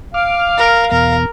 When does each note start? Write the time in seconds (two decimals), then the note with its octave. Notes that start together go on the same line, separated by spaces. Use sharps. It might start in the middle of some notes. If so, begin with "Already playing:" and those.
0.14 F5 D6 F6
0.58 A#4
0.91 E2 B2 A#4